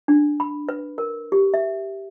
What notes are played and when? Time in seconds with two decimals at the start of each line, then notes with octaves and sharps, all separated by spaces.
0.08 D4
0.40 B5
0.69 B4
0.98 A#4
1.32 G4
1.54 E5